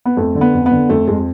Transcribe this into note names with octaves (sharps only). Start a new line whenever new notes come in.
B3
F2 A3
D3
B3
F2
B3
D3
F2 A3
F2 G#3